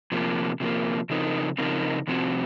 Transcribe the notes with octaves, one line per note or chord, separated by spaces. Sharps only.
C3 F3 A#3
C3 F3 A#3
C#3 F3 C4 D#4 A#4
C#3 F3 C4 D#4 A#4
C3 F3 C4 F#4